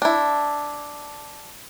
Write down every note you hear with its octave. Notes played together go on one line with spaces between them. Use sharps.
D4 E4